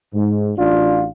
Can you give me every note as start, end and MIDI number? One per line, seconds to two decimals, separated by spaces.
0.13 0.52 44
0.57 1.07 33
0.57 1.07 62
0.57 1.07 65